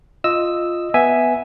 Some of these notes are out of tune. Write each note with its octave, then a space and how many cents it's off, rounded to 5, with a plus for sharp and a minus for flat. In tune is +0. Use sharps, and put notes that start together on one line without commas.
F4 +0 D#5 -5 E6 +0
B3 +0 E5 +0 G#5 +0